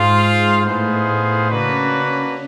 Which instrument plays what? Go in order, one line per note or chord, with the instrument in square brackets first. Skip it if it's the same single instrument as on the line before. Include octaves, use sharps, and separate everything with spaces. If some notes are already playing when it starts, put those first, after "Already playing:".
Already playing: [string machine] G#2 G#3 [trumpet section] F4 G#4 C5 F5
[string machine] A2 A3 [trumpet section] B3 D#4 G#4 C5 F5
[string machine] C#3 C#4 [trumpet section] A#3 D4 F#4 B4
[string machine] C#3 C#4